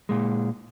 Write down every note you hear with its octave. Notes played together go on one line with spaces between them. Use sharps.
A#2 G#3